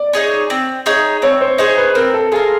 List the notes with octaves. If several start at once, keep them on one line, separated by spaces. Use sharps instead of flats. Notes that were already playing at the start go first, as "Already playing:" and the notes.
Already playing: D5
D#4 G#4 C#5
C4
D#4 G#4 C#5
C4 C#5
C5
D#4 G#4 C5 C#5
B4
C4 A#4
A4
F4 G#4 A#4